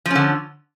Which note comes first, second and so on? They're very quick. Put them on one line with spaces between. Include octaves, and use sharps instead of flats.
F3 C#4 D3